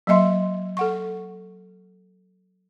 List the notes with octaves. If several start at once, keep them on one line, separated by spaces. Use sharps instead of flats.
F#3 A#3 D#5 E5 C6
A4 F#5 C#6